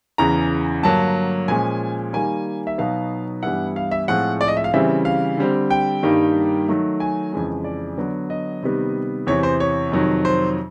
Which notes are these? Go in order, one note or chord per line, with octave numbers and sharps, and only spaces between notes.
E2 C#3 E3 A#5
G2 D3 F#3 A#3 A5
A#2 F3 G#3 C#4 G#5
D#3 G3 A#3 G#5
E5
B2 F#3 B3 D#4 F5
G2 E3 G3 B3 E4 F#5
F5
E5
A2 F3 G#3 C4 F4 F#5
D5
D#5
E5
F5
C#3 E3 G3 C4 E5
F5
D3 G3 C4
G5
G2 D#3 G3 A#3 D#4
D#3 F#3 A3
G#5
F2 C#3 E3 G#3
D5
D3 F#3 B3
D#5
C3 D#3 G3 B3
E2 C3 E3 C#5
C5
C#5
F2 C3 D#3 F#3
C5